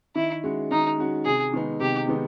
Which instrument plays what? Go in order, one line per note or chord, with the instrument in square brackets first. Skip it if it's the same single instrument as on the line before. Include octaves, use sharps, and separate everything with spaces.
[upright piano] D#3 [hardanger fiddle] E4
[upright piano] G#3 C#4 F#4
[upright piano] D#3 [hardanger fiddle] D#4
[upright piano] G#3 C#4 F#4
[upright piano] C3 [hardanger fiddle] G#4
[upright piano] D#3 G#3 B3 D#4
[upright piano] C3 [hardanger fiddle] G4
[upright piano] D#3 G#3 B3 D#4